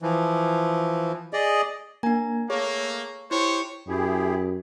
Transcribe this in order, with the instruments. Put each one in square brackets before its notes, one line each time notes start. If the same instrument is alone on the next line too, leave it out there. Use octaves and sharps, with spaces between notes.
[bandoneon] E3 F3
G#4 D5 D#5
[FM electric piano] A#3 G#5 [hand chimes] D4 A#5
[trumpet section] A3 A#3 [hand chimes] G#4 [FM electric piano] C#5
[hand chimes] E4 C#7 [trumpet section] G4 C5 C#5
[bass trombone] F#2 [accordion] E4 G4 G#4